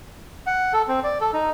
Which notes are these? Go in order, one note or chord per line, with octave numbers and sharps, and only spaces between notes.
F#5
A4
C4
D5
A4
D#4